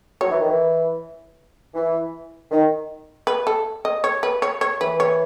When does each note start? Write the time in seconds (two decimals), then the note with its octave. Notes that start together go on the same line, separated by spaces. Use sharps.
0.20 F#3 C#5
0.30 E3
0.40 D#3
0.49 E3
1.74 E3
2.51 D#3
3.27 B4
3.47 A4
3.85 D#5
4.04 C#5
4.23 B4
4.42 C#5
4.61 C#5
4.81 E3 B4
5.00 C#5